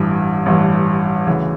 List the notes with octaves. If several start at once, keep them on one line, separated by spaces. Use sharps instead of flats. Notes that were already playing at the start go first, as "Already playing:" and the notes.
Already playing: A1 G2 E3
A1 G2 E3
D2 C#3 E3